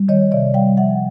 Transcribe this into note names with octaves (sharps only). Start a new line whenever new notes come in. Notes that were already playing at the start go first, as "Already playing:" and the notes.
Already playing: G3
D#3 C#5 D#5
C3 D5 E5
G3 F5 G5
F3 E5 F#5